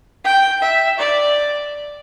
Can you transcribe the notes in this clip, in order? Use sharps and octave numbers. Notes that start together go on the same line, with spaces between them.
G5
E5
D5